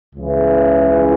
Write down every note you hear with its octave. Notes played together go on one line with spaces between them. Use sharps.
C#2 C#3 E3